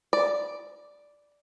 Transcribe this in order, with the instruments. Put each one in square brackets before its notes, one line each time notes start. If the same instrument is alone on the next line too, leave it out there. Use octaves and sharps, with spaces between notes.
[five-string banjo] D5